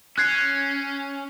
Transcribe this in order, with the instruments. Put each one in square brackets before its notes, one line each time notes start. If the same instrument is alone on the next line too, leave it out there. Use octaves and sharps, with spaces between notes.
[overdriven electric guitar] C#4 [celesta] F#6 G#6 C7